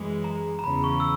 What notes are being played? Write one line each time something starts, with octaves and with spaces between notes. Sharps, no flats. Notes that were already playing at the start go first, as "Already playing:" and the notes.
Already playing: F#2 E3 G#3
A#5
A#5
E2 C#3 E3 B5
C#6
E6